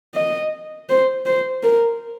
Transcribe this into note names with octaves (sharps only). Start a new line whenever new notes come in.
D#5
C5
C5
A#4